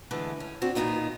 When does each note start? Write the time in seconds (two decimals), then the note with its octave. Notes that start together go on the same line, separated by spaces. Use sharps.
0.11 D3 E3 G#3 A3
0.40 C#4
0.62 C4 D4 F#4
0.75 A#2 D#3 B3 D#4 F4